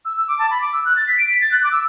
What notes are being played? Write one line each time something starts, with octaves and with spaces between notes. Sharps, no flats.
E6
E6
D6
A5
B5
D6
E6
F#6
A6
B6
D7
B6
A6
F#6
D6
E6